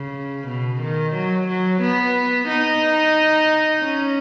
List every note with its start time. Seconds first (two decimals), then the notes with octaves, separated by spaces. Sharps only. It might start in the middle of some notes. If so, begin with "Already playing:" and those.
Already playing: C#3
0.48 B2
0.81 D#3
1.15 F#3
1.48 F#3
1.82 B3
2.49 D#4
3.84 C#4